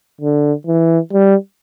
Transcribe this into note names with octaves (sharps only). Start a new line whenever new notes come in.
D3
E3
G3